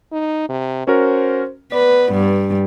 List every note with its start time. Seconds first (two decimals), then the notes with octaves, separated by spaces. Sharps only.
0.12 D#4
0.49 C3
0.87 C#4 F#4 A#4 C5
1.72 B3 B4 D5
2.12 G2